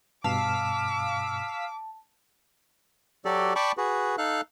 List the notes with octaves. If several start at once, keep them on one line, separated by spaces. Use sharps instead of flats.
G2 B2 F5 A5 D6 E6 B6
F#3 F#4 G4 A4 D5
D5 G5 A5 B5 C#6 D6
F#4 G#4 B4
D#4 A4 F5 F#6